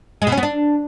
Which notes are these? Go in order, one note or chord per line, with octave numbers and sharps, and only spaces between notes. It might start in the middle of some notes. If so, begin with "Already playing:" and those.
G#3
B2
C#4
B3
D4